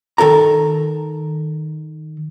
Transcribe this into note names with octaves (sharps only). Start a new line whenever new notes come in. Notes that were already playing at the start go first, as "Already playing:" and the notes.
D#3 A4 A#4 A#5